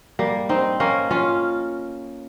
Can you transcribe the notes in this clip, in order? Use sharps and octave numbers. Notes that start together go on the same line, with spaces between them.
G3 A#3
C4 D#4
A#3 C#4
C#4 F4